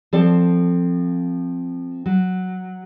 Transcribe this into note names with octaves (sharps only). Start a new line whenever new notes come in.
F3 C4 A4 D5
F#3